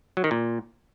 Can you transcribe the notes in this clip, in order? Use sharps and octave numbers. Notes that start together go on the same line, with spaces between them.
F#3
D#3
A#2